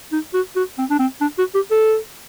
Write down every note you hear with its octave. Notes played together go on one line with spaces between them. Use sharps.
D#4
F#4
F#4
C4
D4
C4
D4
F#4
G4
A4